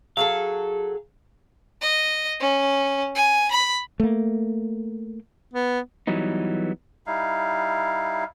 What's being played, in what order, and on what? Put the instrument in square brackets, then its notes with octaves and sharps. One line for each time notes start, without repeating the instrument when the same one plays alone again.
[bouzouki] F#3 G#4 A4 [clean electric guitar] F5
[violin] D#5
C#4
G#5
B5
[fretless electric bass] A3 A#3
[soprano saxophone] B3
[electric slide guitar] E3 F#3 G3 B3 D#4
[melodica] G3 D#4 E4 F5